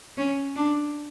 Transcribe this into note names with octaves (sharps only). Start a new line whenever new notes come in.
C#4
D4